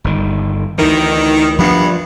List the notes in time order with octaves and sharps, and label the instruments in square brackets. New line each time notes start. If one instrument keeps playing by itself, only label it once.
[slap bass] G1 D#3
[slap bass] D2 E3 [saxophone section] D#3
[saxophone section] G2 B3 [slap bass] F3 D4